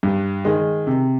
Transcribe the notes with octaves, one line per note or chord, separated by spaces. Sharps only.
G2
D#3 G#3
C3